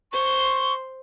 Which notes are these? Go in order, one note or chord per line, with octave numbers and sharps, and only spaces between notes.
C5 C6 C#6